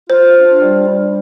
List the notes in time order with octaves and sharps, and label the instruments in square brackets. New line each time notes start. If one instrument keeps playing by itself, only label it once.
[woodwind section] F4 [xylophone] C5
[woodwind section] D4
G3
G3